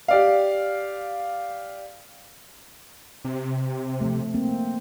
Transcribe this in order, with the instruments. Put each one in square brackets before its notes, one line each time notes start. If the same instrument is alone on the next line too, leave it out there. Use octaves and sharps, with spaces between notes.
[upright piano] G4 D5 F5
[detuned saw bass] C3
[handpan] F3 A3
A#3 C4